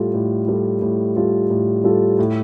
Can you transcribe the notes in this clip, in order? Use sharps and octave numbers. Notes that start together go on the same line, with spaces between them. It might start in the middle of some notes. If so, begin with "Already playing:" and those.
Already playing: A2 G3 F4 A4
A2
G3 F4 A4
A2
G3 F4 A4
A2
G3 F4 A4
A2